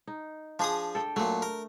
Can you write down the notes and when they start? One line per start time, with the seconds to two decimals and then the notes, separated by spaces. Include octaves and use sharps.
0.07 D#4
0.59 F3 D4 G#4 D#6
0.95 A4 G5
1.16 A#2 F#3 A3
1.42 A#4